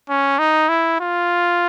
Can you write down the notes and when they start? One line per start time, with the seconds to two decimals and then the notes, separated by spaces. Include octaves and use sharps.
0.09 C#4
0.39 D#4
0.69 E4
1.01 F4